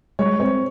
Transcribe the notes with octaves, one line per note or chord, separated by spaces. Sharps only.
G#3 C#5
C4 C#5